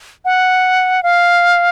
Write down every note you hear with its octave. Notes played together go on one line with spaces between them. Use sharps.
F#5
F5